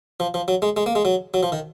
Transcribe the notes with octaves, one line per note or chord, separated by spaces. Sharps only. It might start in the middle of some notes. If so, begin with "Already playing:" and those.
F3
F3
F#3
G#3
G#3
A#3
G#3
F#3
F#3
F3
D#3